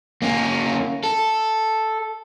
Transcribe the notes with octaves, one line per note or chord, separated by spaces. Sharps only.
A#3 C#4
A4